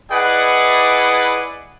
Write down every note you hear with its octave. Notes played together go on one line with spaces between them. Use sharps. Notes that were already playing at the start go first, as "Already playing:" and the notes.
E4 G#4 B4 D5 D#5 F#5